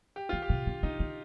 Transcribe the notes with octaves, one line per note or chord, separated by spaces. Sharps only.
G4
D#3 F4
G4
C3
D3
D3 D#4
D3